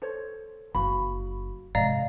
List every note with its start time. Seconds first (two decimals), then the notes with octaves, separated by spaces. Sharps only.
0.02 A4 C5 C#5
0.75 F#1 F#4 F5 B5
1.75 G#2 C3 D5 D#5 F5 A#5